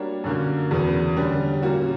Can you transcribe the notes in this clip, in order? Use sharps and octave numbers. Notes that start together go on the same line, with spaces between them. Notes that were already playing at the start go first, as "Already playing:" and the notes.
Already playing: G3 A#3 D4 F#4 C#5
F#2 D3 A#3
E2 C#3 F#3 B3
D3 G3 C#4
A#2 A#3 C#4 F#4